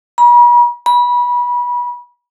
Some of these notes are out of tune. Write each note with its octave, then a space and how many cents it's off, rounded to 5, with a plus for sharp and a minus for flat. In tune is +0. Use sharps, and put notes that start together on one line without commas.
B5 -45
B5 -25